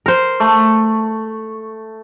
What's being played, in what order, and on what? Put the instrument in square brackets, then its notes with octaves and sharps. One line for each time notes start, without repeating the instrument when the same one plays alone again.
[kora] A#4 C5
[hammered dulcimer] A3